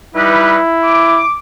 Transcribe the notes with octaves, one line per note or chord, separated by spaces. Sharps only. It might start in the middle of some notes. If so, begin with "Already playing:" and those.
G3 D#4 E4 B4
D6